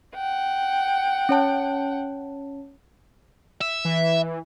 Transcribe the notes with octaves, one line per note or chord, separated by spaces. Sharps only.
F#5 G5
C#4 C#5 A5
E5
E3